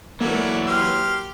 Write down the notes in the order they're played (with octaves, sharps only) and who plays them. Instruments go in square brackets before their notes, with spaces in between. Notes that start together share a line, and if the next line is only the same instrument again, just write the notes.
[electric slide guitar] E3 F#3 [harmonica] A3 D5 [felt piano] A#3
[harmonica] G4 C6 F6